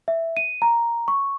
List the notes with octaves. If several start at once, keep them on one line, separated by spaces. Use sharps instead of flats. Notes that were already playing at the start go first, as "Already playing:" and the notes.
E5
D#7
A#5
C#6